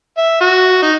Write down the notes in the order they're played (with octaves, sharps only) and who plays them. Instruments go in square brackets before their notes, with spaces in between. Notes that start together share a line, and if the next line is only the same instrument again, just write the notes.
[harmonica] E5
F#4
D#4